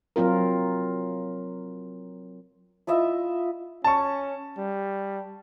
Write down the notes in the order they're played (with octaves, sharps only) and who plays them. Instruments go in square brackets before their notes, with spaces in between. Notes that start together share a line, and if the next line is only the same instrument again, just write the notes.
[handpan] F#3 C4 F4 A#4
[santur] E4 F4 D#5 E5
[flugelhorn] C#4 [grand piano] A5 C#6
[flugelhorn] G3